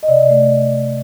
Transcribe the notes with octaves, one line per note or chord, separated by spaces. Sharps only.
D#5
C3 D5
A3